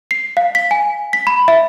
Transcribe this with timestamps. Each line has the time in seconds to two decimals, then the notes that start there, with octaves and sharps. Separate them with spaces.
0.11 C7
0.37 F5
0.55 B6
0.71 G#5
1.13 B6
1.27 B5
1.48 E5